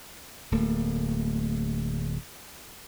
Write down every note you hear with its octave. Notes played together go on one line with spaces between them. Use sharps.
D1 A3 A#3